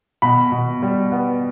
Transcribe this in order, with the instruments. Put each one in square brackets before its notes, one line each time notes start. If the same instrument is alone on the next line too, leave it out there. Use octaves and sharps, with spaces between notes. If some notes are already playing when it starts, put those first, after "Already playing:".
[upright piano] B2 B5
B2
G3
B3